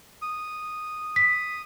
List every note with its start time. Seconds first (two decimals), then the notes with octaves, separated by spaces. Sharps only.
0.22 D#6
1.16 B6